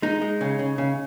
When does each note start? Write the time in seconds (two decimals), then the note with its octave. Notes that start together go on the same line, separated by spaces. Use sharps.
0.02 G#3 D#4
0.21 G#3
0.41 C#3
0.59 C#3
0.78 C#3